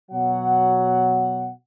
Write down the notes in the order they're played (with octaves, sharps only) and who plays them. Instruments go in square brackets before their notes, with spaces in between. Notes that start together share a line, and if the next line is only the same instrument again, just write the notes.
[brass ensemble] B2 F#3 F#5